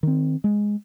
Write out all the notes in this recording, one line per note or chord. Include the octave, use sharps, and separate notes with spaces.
D#3 C4
G#3